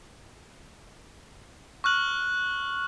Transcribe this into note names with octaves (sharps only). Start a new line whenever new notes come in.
C#6 F6 F#6 F#7